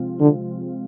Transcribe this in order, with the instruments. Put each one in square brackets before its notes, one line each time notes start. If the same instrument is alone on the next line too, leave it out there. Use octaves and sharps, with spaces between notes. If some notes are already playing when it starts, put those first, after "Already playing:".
Already playing: [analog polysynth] C3 F3 G#3 C4 F4
[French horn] D3